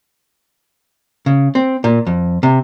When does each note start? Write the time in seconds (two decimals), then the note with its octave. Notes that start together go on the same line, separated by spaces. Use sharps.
1.26 C#3
1.55 C4
1.84 A#2
2.07 F2
2.43 C3